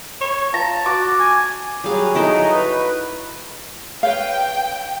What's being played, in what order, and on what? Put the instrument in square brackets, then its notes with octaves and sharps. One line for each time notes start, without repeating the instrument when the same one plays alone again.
[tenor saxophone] C#5
[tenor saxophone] F4 [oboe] A5 [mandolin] A#5
[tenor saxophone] F#4 [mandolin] D6
[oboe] G#5
[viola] F#3 G#4 [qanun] G3 F5
[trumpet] D#4 [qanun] E4 A4 A#4
[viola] F#4 B4
[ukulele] B4 C#5 F5 [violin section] G5